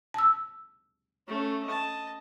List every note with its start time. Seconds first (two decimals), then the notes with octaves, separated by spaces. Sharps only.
0.14 A5 E6
1.28 A3 C#4
1.65 D#5 A5